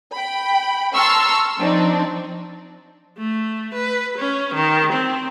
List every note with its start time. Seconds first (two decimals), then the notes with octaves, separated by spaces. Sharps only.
0.13 G5 B5
0.94 A5 A#5 C6 C#6 E6 F6
1.58 F3 C4 D4 D#4
3.18 A3
3.74 B4
4.18 C#4
4.55 D#3
4.93 C4